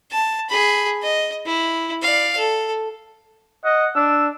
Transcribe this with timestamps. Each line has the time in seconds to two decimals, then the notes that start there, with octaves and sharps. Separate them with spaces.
0.11 A5
0.49 G#4 B5
1.02 D#5
1.46 E4
2.02 D5 F5
2.37 A4
3.65 D#5 F#5
3.95 D4 E6